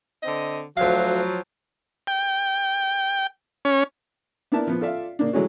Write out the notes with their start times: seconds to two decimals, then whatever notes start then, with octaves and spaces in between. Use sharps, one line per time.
0.23 D3 C4 D#5
0.77 D2 F3 F#3 F5
2.07 G5
3.65 C#4
4.52 B3 D4 E4 A#4 E5 A5
4.67 F3 B3
4.81 F4 A4 D5 E5 F5
5.19 C#3 A#3 D4
5.33 E3 F#3 G#3 A3 C#4 F#4